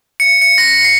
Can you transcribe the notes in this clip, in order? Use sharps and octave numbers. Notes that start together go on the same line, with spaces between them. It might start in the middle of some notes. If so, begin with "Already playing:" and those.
C#7
C#7
A#6
C7